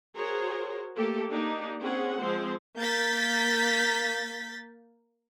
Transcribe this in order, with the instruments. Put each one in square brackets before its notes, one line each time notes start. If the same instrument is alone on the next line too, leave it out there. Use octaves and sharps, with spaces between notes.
[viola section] F#4 G#4 A#4 C5 C#5
A3 A#3 G4 A4
A#3 D4 D#4 G4
C4 C#4 G#4 F#5
F3 G#3 C4 C5
[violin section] A#3 G6 A6 B6